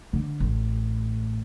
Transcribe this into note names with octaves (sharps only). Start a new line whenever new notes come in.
D3
A1